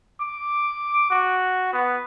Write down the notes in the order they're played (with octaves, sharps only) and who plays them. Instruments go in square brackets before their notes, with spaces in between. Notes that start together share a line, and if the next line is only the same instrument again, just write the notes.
[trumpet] D6
F#4
B3